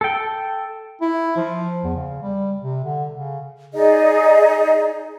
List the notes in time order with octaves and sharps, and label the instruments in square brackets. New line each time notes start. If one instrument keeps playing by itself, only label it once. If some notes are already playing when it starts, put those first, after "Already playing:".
[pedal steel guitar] A4 G5
[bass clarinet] E4
F3
E2
C#3
G3
C3
D3
C#3
[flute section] D#4 G#4 D5 D#5